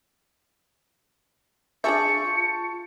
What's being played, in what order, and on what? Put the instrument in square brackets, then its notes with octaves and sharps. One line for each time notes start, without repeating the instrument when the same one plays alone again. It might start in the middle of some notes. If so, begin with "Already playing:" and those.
[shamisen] D4 G#4 E5 [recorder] F4 [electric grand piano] A5 C#6 G6 [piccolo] C#7